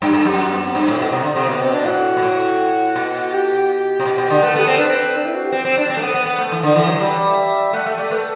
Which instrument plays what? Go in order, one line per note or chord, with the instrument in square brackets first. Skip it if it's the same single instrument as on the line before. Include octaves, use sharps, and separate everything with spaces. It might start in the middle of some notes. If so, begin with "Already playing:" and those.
[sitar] G2 [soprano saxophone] G5
[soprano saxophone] G4
[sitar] G2 [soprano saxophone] A4
[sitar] F#2 [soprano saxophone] G4
[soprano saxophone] F#4
B3
C4
[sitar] G2
A2
B2
C3
D3
C3
[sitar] B2 [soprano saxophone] B3
[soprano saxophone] C4
D4
[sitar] A2 [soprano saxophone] F#4
[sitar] B2
A2
B2
[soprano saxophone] G4
[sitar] C3
B2
B2
D3
[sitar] A3 [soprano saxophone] B4
[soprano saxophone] A4
[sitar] B3 [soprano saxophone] G4
[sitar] C4 [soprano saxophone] A4
[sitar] D4 [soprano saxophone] B4
[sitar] C4
[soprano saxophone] D4
E4
F#4
G4
[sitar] C4
C4
D4
C4
A3
B3
B3
B3
A3
E3
D3
E3
F#3
[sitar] G3 [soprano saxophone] A4
[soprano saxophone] B4
D5
E5
[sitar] A3 [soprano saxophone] F#5
[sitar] A3 [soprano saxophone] E5
[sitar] A3 [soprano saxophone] D5
[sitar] A3 [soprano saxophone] B4
[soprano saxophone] A4